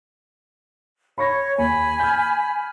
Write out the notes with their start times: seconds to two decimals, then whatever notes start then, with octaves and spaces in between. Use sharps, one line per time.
1.18 C#5 B5 C#6 A#6
1.58 D#2 G#5 B5
2.00 F6 G6